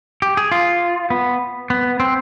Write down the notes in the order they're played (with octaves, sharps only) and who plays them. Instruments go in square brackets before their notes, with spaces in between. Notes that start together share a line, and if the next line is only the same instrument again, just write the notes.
[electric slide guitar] G4
G#4
F4
B3
B3
C4